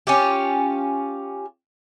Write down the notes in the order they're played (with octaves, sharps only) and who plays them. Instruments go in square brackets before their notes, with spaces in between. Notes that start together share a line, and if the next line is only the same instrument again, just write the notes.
[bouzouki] C#4 F4 G4